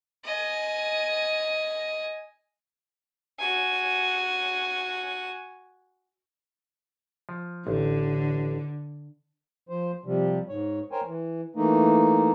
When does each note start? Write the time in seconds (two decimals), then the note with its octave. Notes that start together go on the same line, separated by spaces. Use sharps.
0.25 D#5 G#5
3.39 F#4 G#5
7.29 F3
7.67 A1 D3
9.69 F3 C5
10.05 C3 F3 G3
10.49 G#2 C#5
10.92 A#4 C5 C#5 G5 G#5
11.05 E3
11.56 E3 A3 A#3 D#4